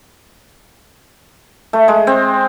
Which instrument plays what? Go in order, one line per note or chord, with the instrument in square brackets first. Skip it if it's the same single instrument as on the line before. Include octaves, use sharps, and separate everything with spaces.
[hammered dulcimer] A3
G#3
C4